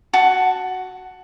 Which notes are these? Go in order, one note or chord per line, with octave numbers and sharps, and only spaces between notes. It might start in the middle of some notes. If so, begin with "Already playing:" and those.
F#4 A5